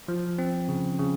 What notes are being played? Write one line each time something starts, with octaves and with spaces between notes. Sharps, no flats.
F3
C4
C#3
C#3